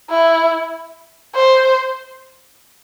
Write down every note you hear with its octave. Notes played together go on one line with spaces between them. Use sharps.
E4
C5